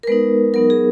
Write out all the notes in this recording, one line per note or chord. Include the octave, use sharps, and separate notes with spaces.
A#4
G#3 B3 D#4 B4
F#3 B3 D#4 A#4
G#4